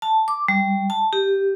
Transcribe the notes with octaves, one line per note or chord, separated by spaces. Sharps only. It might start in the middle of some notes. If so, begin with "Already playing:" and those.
A5
D6
G3
A5
G4